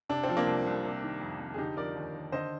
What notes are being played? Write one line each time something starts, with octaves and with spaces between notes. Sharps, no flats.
C3 D4
C4
F3
A#3 D4
C2
C2
C3
D#3
F2
F2
G#4
D3 D#4 G4
F3 A#4 D5
D#2
D#2
D3 C5 D#5